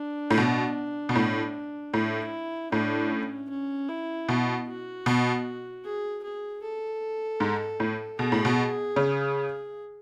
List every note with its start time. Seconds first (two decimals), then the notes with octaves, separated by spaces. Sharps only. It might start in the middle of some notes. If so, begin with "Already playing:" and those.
Already playing: D4
0.30 A2
0.38 B2
1.09 B2
1.15 A2
1.94 A2 E4
2.72 A2 D4
3.11 C#4
3.50 C#4
3.89 E4
4.29 B2
4.68 F#4
5.06 B2
5.84 G#4
6.23 G#4
6.62 A4
7.40 G#2
7.80 A2
8.19 B2 G#4
8.32 A2
8.45 B2
8.96 C#3